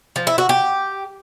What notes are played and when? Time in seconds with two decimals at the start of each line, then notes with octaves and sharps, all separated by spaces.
0.16 F3
0.27 E4
0.38 F#4
0.49 G4